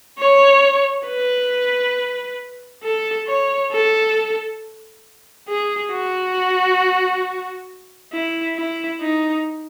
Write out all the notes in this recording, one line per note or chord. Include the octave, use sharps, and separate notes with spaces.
C#5
B4
A4
C#5
A4
G#4
F#4
E4
E4
D#4